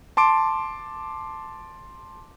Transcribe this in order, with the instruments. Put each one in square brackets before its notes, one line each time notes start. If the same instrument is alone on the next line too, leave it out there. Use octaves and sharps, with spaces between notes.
[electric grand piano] A5 C6 D6 D7